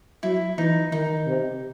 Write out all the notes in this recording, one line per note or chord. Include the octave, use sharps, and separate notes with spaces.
F#3 E4
E3 D#4
D#3 D#4
C3